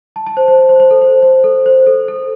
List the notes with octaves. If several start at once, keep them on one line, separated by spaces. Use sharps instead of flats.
A5
A5
C5
C5
C5
C5
C5
A4
C5
C5
A4
C5
A4
A4